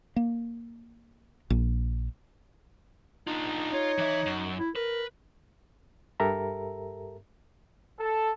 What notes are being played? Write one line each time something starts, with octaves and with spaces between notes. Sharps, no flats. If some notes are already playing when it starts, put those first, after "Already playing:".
A#3
A#1
D4 D#4 F4
F4 C#5
E3 E5
F#2
E4
A#4 B4
G2 G4 A4 A#4 E5 A#5
A4